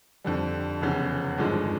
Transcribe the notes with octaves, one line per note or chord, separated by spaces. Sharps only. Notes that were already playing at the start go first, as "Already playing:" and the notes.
F2 D3 G3
F1 E2 C#3
G#1 G2 D3 F3 G#3